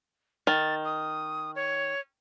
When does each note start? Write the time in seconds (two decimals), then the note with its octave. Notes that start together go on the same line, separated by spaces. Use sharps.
0.47 D#3 A6
0.85 D#6
1.56 C#5